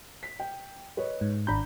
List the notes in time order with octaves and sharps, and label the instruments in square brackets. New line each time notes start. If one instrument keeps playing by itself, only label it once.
[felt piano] B6
G5
B4 C#5 D#5
[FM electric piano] G#2
[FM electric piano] G#1 B5 G6 [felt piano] D4 A#5